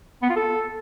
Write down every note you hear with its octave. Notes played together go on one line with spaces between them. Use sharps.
B3
F4
A4